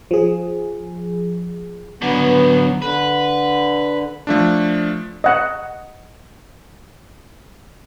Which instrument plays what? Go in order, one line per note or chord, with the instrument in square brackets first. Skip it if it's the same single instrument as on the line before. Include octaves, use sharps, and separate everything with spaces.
[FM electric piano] F3 G#4
[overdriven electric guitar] D3 F#3 [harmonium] B3
[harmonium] D3 [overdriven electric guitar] B4
[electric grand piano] F3 A3 D4
[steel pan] D#5 F#5